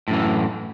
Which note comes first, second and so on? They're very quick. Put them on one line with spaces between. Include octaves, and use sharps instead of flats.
A2 F#2 E3